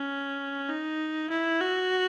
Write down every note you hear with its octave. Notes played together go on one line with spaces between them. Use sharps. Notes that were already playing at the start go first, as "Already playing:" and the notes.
Already playing: C#4
D#4
E4
F#4